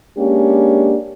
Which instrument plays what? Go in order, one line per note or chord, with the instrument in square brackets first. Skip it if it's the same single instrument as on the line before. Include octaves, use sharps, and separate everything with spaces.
[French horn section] G#3 A#3 C#4 D4 G4